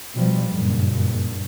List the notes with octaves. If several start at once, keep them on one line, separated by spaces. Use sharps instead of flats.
B2 F3 G3
F#1 G2 A#2